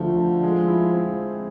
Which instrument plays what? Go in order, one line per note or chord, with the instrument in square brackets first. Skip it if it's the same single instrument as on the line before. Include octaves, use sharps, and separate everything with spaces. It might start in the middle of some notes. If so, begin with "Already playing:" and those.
Already playing: [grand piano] D2 D3 A3 [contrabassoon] F3
[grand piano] D3
G#3
E4
C4